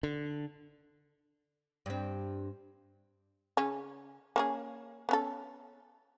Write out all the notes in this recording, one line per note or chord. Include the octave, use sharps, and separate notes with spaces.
D3
G2 C4
C#3 C#4
A#3 C#4 G#4
B3 C#4 A4